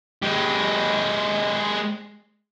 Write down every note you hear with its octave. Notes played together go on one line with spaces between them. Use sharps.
G#3 G4